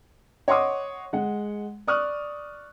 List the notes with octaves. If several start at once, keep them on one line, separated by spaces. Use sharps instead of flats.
C#5 D#5 F#5 C6 D6 D#6
G#3 F#5
D5 C#6 D#6 F6 F#6